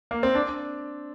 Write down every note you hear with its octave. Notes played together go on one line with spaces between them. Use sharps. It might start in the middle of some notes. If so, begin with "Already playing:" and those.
A#3
C4
D4